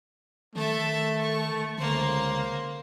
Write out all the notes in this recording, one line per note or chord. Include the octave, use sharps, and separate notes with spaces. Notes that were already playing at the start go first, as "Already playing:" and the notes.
D#3 A3 A4 E5
C#6
C#2 D3 A#3 C5